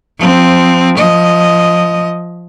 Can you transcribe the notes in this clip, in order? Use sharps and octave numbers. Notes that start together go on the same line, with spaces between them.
F3 C4
F3 D#5